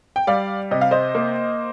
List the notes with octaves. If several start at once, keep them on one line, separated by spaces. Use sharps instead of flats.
G5
G3 D5 F5
C3 D#5
F5
C5 D#5
A#3